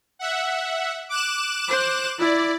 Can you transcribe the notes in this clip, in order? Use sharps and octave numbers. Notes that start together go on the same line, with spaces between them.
E5 F#5
D6 F#6 E7
C5
E4 D5